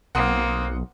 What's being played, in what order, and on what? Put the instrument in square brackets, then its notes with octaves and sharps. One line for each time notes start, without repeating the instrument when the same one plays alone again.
[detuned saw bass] B1 [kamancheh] A#3 C4 [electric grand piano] F#5 C6 D#6